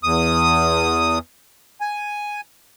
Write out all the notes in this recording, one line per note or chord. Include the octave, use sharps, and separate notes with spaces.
E2 D#6
G#5